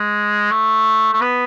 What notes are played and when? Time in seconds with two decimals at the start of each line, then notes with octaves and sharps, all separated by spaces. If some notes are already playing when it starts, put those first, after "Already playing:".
Already playing: G#3
0.51 A3
1.13 A3
1.21 B3